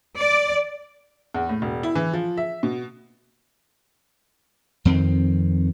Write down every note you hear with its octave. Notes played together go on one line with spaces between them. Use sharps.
D5
E2
A2
E1
E4
E3
F3
E5
B2
F2 D#3 C4